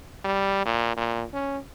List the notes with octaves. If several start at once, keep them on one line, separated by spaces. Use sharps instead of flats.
G3
A#2
A#2
C#4